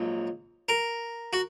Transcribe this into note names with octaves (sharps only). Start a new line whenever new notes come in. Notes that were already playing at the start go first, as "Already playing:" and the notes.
Already playing: A#1 G#2 F#3
A#4
F#4